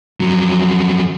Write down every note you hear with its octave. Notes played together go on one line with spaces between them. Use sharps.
F2 F#3